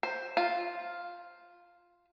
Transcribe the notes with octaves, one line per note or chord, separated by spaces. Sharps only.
C5
F4